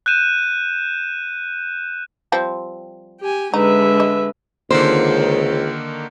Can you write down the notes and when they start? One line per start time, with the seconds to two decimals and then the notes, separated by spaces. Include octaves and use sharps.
0.06 F#6 G6 D#7 E7
2.32 F3 G3 C4
3.21 G4 G#5
3.54 D3 G#3 D#4 B4 E5
4.00 D#5
4.71 C#2 D3 D#3 A#3 C5